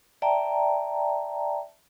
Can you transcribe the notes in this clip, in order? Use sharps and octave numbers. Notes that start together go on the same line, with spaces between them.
D5 E5 G5 A5 A#5